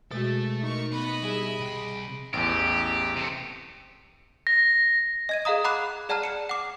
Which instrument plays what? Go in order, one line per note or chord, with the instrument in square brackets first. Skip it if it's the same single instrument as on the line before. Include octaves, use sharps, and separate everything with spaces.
[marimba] B2 F#4 [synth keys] G#3 A6 [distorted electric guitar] A3 A4 [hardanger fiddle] E5
[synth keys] D#4 [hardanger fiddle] A#4 C#6
[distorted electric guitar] B3 [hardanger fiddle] D#5 B5
[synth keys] G3 G#4 [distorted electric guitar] E4
[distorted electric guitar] C2 G5
[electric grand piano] A1 E2 [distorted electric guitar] G4
[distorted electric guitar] C3 A3
[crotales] A#6
[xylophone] D#5 G#6 D#7
G#4 D#5 F5 A#5 D#6
F#5 A#5 B5 D6 F#6
G#4 D5 F#5 A5 A#5 F6
C#7 E7
F#5 D6